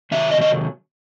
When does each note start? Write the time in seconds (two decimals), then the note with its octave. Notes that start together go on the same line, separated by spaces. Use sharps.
0.11 C3 D#3 F#3 E5
0.31 D#5
0.41 D#5